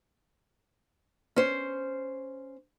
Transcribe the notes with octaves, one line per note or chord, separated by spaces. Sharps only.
C#4 C5